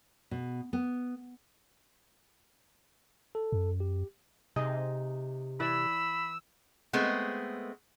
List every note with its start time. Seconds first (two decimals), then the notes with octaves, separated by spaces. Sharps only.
0.31 B2
0.73 B3
3.35 A4
3.52 F#2
3.80 G4
4.56 C3 D#4 G#4 D#5
5.60 E3 E4 D5 B5 E6
6.93 G#3 A3 B3 C4